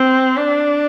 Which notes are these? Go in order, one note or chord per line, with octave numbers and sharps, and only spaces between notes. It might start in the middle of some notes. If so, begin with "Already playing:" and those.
Already playing: C4
D4